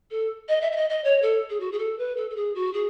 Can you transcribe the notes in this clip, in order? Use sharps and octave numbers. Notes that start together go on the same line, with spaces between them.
A4
D#5
E5
E5
D#5
D#5
C#5
A4
G#4
F#4
G#4
A4
B4
A4
A4
G#4
F#4
G#4